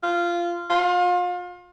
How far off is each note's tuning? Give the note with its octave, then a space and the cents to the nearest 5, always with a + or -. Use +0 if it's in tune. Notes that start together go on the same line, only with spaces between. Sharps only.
F4 -15
F4 +30